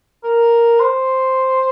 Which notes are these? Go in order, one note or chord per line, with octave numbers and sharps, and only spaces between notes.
A#4
C5